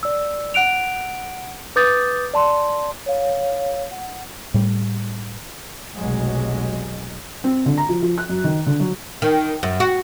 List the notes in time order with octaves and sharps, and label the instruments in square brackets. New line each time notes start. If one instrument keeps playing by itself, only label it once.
[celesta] D5 E6
F#5 F#6 D7 F7
B4 D6 D#6 G6 A6
D5 A5 C6
[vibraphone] C#5 F5
F#5
[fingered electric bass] A2 G3
[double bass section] F1 B1 F#3 G#3
[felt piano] C4
D3
A#5
F3
F3
F#6
F#2
D#3
D3
F#3
[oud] D#3
F#2
F#4